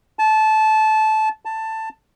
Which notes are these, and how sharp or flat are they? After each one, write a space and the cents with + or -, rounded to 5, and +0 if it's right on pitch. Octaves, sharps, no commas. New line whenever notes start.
A5 -20
A5 +10